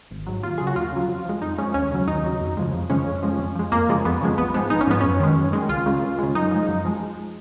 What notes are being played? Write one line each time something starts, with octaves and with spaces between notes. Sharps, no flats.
G#1
G#2 F#3
D#2 F4
C#3 F#3 G#4
F#4
D#2 F4
C#3 F#3
F2
F3 G#3
F2 D#4
F3 G#3 C#4
D#2 C#4
C#3 F#3
D#2 D#4
C#3 F#3
F2
C#3 F3 G#3
F2
C#3 F3 G#3 C#4
F2
F3 G#3
F2
F3 G#3
F2 A#3
C#3 F3 G#3
F2 B3
C#3 F3 G#3
A#1 B3
G#2 F3 G#3 B3
A#1 D#4
C#4
G#2 F3 G#3 B3
F#2 C#4
D#3 G#3
F#2
D#3 G#3
C#2 F4
C#3 G#3
C#2
C#3 G#3
F#2 D#4
F3 G#3
F#2
F3 G#3